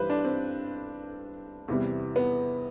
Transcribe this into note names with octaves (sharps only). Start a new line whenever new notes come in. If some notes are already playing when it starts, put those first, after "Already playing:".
Already playing: G2 E3 G3 B4 C5
D4
C4
E2 C3 E3 G3
B3